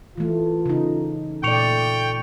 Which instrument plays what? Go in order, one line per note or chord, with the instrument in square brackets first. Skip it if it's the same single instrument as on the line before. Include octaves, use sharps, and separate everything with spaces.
[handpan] E3 A3 [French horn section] F4
[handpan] C#3 D#4
[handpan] A#2 D5 [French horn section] A3 [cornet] G5 [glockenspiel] C#6 C#7 F7